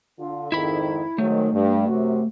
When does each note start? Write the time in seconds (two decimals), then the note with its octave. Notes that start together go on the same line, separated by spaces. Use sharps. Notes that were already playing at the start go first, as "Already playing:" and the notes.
0.19 D3 F4
0.52 F2 G#2 D#3 E4 B5
1.18 G#2 D#3 F#3 A3
1.53 G2
1.88 F#2 C3 F#4